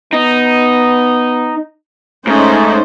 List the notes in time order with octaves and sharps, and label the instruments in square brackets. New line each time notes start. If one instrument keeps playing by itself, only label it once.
[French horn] B3 [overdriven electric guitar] D#4
[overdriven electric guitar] G#2 [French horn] A3 [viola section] C#4 D#4 C5